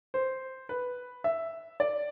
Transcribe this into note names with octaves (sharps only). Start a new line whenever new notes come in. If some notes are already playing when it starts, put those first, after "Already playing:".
C5
B4
E5
D5